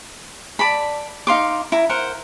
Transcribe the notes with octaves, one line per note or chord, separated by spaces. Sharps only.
D5 A5 B5
D#4 F5 C6 D6
E4 A#5
A#4 C5 F#5